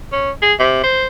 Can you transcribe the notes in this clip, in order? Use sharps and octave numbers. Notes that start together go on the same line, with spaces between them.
C#4
G#4
C3
C5